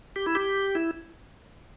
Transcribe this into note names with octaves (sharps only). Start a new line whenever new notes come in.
G4
E4
G4
E4